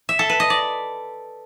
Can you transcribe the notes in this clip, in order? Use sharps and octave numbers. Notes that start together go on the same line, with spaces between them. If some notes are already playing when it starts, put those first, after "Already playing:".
E5
A4
B4
D#5
D5